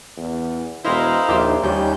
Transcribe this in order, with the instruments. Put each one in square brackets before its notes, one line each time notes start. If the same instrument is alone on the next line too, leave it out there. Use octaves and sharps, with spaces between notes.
[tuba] E2
[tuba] E1 [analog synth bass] E4 [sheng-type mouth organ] C5 D#5 F5 [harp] G5 A#5 C6
[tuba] A#1 [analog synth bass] D#2 [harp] E5 C6 D6
[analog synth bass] D#2 [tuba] G3 [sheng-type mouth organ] C#4 G6